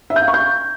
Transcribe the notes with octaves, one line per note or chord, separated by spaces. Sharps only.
E5
G6
F5
C#6
G6